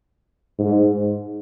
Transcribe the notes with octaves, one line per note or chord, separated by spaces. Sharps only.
G#2